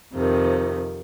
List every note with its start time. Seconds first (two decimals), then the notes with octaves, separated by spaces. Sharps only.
0.14 F2 C3 D#3 F3